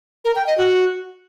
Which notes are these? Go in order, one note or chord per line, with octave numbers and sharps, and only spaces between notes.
A#4
G5
D#5
F#4